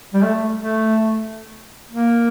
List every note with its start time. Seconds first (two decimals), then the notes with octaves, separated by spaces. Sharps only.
0.14 G3
0.23 A3
0.57 A3
1.90 A#3